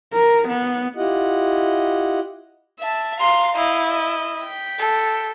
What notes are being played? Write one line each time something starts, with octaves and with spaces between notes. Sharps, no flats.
A#4
B3
E4 F4 G4 D#5 F#5
E5 A5
F5 A#5 C6
E4 D#5 F5
D#5
G5 B6
A4